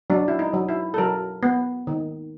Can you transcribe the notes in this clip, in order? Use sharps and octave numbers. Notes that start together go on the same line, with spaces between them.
F#3 D4
E4
D#4
F#3
E4
A4
F#3 A#4
B3
D#3